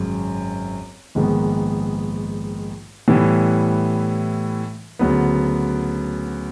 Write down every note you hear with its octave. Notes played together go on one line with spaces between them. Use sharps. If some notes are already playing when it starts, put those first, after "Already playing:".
Already playing: G#1 F#2 C#3
A#1 G#2 D#3 G#3 B3
A2 E3 G3 B3
D2 C#3 F#3 B3